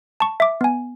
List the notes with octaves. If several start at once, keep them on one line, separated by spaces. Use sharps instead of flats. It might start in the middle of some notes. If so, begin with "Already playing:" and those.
A5 C#6
E5 D6
B3 G#5